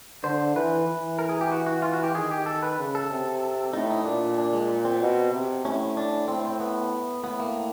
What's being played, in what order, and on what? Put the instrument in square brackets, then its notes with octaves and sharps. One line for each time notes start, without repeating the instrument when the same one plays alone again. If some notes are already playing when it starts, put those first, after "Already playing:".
[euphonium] D3 [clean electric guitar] C5
[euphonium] E3 [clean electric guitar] B4
[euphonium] E3
[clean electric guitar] A#4
G#4
G4
F#4
F#4
F4
F#4
G4
[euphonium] D#3 [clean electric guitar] G#4
[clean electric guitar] G4
A4
B4
[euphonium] C#3
[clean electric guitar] A4
[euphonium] C3
[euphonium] A2 [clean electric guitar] D#4
[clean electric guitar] D#4
[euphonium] A#2 [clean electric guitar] D4
[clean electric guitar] D4
G#3
C4
[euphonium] B2
C3
[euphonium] A2 [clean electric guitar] C#4
[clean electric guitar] D4
[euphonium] A2 [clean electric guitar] C4
[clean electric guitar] C4
B3
[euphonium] A2 [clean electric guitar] B3
[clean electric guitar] A#3